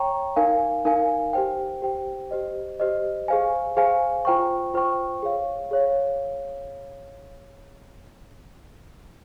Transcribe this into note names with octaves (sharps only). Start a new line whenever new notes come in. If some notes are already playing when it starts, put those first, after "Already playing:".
Already playing: C#5 G5 A#5 C#6
D#4 A#4 F5 G#5
D#4 A#4 F5 G#5
G4 C5 G5
G4 C5 G5
G4 C5 D#5
G4 C5 D#5
G#4 C5 F5 G#5
G#4 C5 F5 G#5
F4 C5 G5 C#6
F4 C5 G5 C#6
G#4 C#5 F5
G#4 C#5 F5